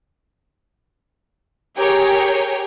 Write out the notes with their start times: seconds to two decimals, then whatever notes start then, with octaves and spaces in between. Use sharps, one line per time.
1.77 G4 G#4 A#4 C#5 G5